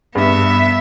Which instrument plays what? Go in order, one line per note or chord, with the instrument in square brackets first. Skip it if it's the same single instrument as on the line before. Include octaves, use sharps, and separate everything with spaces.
[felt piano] G2 [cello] B3 E5